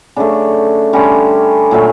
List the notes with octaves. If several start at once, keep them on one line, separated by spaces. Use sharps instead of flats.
C#3 F#3 A3 D4
D3 G3 C#4
A#2 F#3 A3